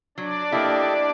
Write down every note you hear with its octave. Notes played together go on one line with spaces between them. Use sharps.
F#3 D4 D5
A#3 E4 G4 A4 D#5